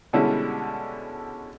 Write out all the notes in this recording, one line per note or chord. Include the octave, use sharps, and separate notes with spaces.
B2 D3 G3 G#3 C#4 E4